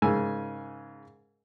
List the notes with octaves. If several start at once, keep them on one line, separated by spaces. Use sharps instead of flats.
G#2 C#3 A#4 G#5 E6